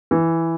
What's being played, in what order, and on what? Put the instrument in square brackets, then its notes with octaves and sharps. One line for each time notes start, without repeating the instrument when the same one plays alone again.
[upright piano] E3